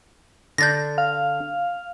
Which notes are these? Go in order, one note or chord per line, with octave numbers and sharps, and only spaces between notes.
D3 D4 G6 A6 A#6
F5